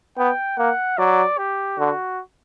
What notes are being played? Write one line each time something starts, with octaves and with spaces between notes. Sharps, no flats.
B3 G5
A#3 F#5
F#3 D5
G4
D3 F#4